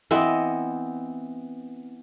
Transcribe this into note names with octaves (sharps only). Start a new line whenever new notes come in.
E3 B3 C4 D#5